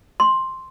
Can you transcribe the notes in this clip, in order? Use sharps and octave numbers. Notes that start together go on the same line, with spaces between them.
C6